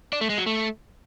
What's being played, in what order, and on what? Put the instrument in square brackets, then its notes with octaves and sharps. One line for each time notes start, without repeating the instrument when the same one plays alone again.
[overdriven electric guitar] D4
A3
G#3
F#3
A3